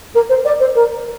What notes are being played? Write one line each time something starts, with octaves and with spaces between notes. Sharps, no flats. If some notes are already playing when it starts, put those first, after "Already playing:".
A#4
C5
D5
C5
A#4